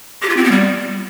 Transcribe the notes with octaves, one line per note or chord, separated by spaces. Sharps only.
G4
F4
C4
B3
G3